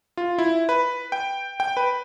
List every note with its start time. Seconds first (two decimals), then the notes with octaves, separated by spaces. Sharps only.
0.17 F4
0.38 E4
0.69 B4
1.12 G5
1.60 G5
1.77 B4